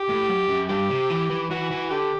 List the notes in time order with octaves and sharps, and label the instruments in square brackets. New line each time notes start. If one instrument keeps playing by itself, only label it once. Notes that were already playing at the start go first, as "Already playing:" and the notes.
Already playing: [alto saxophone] G4
[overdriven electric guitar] A2
F#2
F#2
[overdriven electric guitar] G2 [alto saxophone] G4
[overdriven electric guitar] C3
E3
E3
[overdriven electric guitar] E3 [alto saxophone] F#4
[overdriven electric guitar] E3
[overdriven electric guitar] D3 [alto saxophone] G4